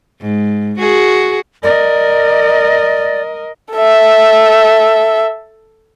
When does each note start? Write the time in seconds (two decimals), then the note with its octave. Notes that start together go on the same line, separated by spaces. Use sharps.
0.21 G#2
0.79 F#4 G#4
1.63 A#4 D5 D#5
3.73 A4 E5